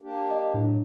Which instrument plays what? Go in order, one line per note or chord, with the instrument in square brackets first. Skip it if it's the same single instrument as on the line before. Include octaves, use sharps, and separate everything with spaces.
[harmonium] A#3 D4 G4
[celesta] D#5
[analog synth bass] A2 [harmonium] F#3 [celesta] D4